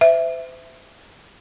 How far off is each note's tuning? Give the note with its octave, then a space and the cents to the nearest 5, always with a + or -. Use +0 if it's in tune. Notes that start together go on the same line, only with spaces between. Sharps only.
C5 -40 E5 +0